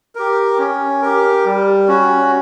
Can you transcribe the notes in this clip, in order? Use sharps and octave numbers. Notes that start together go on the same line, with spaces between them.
G4 A#4
C#4
G4 A#4
G3
C#4 F#4